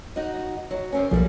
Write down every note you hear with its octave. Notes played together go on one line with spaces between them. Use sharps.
D#4 F#4 D#5
F#3
F#2 C4 C#4
B1 G#2 F3 G3 A#3